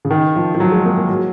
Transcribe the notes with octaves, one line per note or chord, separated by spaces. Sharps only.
C#3
D#3
F3
F3
F#3
G#3
A#3
A#3
F#3